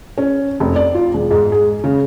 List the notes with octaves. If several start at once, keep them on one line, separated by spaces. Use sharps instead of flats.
C#4
F1
D5
F4
E1
G#2
G#4
C#3